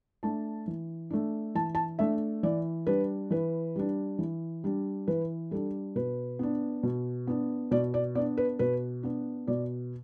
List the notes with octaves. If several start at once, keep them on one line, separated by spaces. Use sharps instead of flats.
A3 D4 A5
E3
A3 D4
E3 A5
A5
A3 D4 E5
E3 D5
G3 D4 B4
E3 B4
G3 D4
E3
G3 D4
E3 B4
G3 D4 A4
B2 B4
B3 D4
B2
B3 D4
B2 D5
D5
B3 D4 D5
B4
B2 B4
B3 D4
B2 D5